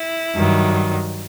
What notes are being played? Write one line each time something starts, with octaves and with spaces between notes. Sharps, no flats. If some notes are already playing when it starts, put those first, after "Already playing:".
Already playing: E4
G2 D#3 F#3